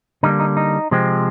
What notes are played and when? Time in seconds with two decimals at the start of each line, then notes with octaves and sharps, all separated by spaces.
0.23 D3 G3 A#3 D#4
0.40 D#4
0.57 D#4
0.91 C3 F3 G#3 C4